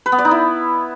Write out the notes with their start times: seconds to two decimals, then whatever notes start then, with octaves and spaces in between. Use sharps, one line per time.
0.06 B4
0.12 B3
0.19 D5
0.25 D#4
0.31 E4